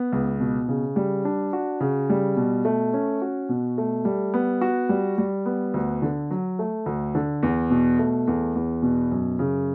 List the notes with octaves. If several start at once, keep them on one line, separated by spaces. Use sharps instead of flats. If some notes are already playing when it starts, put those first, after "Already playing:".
Already playing: B3
C#2
B2
C#3
G3
D4
F#4
C#3
G3
B2
A3
C#4
F#4
B2
A3
G3
B3
F#4
G3
G3
B3
D2
D3
F#3
A3
D2
D3
E2
B2
A3
E2
E2
B2
F#2
C#3